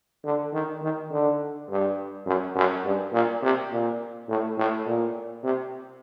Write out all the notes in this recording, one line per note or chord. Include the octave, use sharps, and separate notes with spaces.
D3
D#3
D#3
D3
G2
F#2
F#2
G2
A#2
C3
A#2
A2
A2
A#2
C3